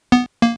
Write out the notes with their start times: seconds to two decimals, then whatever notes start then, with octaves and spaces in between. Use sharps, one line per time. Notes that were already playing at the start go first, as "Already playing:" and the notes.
0.12 B3
0.42 A#3